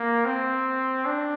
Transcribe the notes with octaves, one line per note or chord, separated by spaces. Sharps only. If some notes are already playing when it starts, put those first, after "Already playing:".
Already playing: A#3
C4
D4